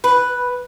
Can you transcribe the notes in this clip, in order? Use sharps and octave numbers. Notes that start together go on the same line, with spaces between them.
B4